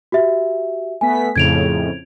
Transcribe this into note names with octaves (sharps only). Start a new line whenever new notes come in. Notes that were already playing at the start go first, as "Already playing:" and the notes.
F#4 G4 E5
A3 B3 G#5 B6
F2 A2 C#3 G#6 D7 F7